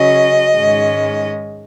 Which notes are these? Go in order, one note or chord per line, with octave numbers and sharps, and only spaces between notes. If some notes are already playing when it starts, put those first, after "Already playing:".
Already playing: C#3 F#3 C#4 D#5
G#2 D#3 G#3 C#4